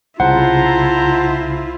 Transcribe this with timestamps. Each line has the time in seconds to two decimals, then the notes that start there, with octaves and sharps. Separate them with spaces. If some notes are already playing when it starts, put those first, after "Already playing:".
0.20 C2 C#3 E4 F4 C5 F#5 A5 A#5